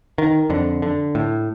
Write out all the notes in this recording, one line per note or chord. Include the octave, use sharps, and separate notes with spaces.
D#3
F2 D3
D3
A2